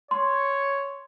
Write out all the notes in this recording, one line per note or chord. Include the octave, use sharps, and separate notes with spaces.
C#5 C6